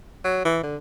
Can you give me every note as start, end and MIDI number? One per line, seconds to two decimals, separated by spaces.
0.24 0.41 54
0.45 0.61 52
0.63 0.76 50